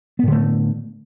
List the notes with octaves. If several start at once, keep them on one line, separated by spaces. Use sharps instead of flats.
A2 D3 A3 B3